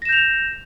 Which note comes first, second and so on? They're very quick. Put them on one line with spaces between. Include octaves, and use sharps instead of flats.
A#6 E7 G6 F7